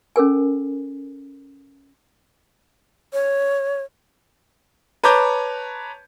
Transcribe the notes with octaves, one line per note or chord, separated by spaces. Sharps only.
C#4 A4 A#4 G#5
C#5
B4 C#5 A5 A#5 D6 G6